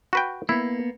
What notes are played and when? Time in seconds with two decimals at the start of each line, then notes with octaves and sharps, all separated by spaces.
0.13 F#4 B4 G5
0.49 A#3 B3 E4